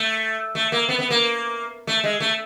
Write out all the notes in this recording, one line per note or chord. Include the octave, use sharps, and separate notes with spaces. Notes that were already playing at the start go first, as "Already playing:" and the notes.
Already playing: A3
A3
A#3
B3
B3
A#3
A3
G#3
A3